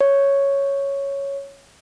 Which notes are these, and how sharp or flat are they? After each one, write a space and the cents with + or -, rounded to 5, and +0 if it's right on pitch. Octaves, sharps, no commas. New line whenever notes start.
C#5 +0